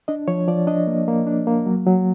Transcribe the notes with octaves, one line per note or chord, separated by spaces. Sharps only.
D4 D#5
F3 C#5
F3 D5
D4 D#5
A#3
A#3
D4
A#3
F#3
F#3